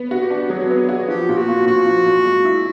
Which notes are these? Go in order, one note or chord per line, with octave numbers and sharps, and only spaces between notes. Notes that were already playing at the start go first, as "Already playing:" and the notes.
Already playing: B3
F#4
G4
D4
F#3 G#4
B3
F#4
F3 G4
A#2 G4
F#4
A#3
A#2 F#4
F3
A#2
G#3
E4